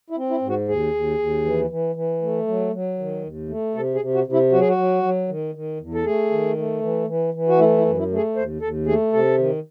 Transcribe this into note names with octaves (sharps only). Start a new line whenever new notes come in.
E4
C4
E4
G#2
F#4
D#2 G#4
D#2
D#2
E3
E3
E3
A3
F#3
F#3
D#3
D#2
A3
C3 A4
G#4
C3
F#4
C3
E4
F#3 F#4
G#4
F#4
F#3
F#3
D#3
D#3
E2
A4
A3 G#4
D#3
A3
E3
E3
E3
F#4
A3 E4
E4
F#2
E4
A3
G#4
D#2 C5
D#2 A4
A3 G#4
C3 A4
D#3